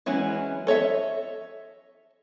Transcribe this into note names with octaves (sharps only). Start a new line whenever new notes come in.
E3 F#3 G#3 C#4 E4
A4 C#5 D#5 E5